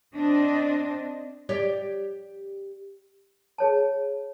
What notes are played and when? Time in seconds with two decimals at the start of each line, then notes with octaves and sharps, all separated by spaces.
0.14 C4 D4 D#5
1.49 G4 C#5 D5
3.58 G#4 C#5 A5